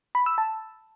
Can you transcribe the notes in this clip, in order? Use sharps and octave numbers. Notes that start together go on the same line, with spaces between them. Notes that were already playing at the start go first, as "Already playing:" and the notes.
B5
E6
A5